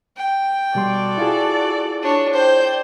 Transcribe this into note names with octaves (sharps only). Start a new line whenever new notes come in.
G5
B2 G3 F#4 A4 D5 C6
E4 F4 G#4
D4 C#5
C5 D5 G5 G6